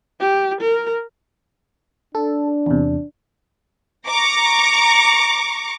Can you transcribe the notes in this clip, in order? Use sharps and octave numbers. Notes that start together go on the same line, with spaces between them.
G4
A#4
D4 A4
E2 C3
A#5 C#6 D6